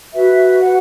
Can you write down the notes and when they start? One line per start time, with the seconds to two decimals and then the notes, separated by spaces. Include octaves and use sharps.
0.14 F#4 B4 E5
0.58 F#5